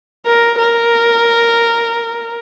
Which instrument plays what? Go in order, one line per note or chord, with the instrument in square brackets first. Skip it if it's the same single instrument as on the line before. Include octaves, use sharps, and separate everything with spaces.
[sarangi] A#4
A#4